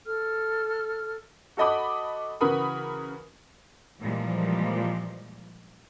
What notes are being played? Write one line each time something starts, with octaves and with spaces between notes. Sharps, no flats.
A4 F6
F#4 A4 D#5 B5 D6
C#3 E3 F#4 A#4 B5 D#6
A#2 E3 F3 G3 G#3